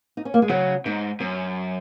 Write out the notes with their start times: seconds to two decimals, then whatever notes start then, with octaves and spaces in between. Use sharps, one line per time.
0.17 D#4
0.25 C#4
0.34 A#3
0.42 G#3
0.49 C#3 F#3
0.85 G#2 D#4
1.20 F#2 C#4